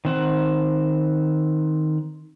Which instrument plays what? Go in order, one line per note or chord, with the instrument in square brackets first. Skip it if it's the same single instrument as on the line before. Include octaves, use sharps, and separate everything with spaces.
[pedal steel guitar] D#3 C4 F#5